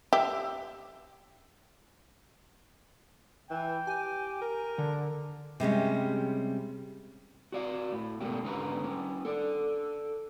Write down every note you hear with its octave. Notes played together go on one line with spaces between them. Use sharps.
G4 E5
E3 G5
G4 G#5
A#4
D3 D4
C3 G3 G#3 C#4
F#4 D5 F5
A2
G#2 B2 A3 A#3 C#4 G4
G#2 D3 C#4 A#4 B4 A#5
A#3 C#4
A4 D5